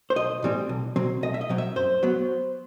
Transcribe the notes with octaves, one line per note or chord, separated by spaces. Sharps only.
C5
B1 D#5
A2 E3 G3 C4
B1
B2 F#3 C4
B1 D#5
E5
D#5
B2 F#3 C4
E5
F#2 C5
F#3 B3